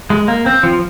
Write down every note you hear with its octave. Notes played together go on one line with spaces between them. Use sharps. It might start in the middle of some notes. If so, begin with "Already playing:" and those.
G#3
A#3
C4
F3